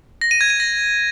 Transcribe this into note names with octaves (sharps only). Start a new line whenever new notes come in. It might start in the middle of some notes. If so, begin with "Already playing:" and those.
A#6
D#7
G#6
D#7
A#6